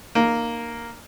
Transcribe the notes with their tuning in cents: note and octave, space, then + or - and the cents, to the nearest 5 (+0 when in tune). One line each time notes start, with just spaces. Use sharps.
A#3 +0 D#4 -30